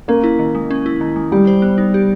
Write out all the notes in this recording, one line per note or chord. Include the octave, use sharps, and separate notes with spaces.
A#3 C#4
E4
D#3
G#3
C#4
E4
D#3
G#3
G3 G4
C5
B3
D#4
G4